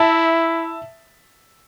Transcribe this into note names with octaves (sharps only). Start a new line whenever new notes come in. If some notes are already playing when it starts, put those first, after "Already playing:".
Already playing: E4 E5 A5